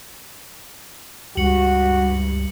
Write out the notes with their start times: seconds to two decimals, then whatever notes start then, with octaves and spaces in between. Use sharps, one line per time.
1.37 C#2 G2 F#4 C#7 F#7